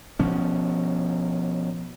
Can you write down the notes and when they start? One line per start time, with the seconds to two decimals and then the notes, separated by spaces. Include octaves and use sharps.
0.19 B2 F3 C#4